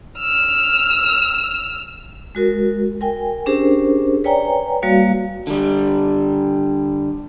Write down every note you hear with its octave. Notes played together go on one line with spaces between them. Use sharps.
E6 F6
G#3 F#4 A#4
A#4 G5 G#5
C#4 D4 G4 G#4 A#4 C5
B4 C#5 D5 G5 G#5 A#5
G3 A#3 F#4 F5
D3 G3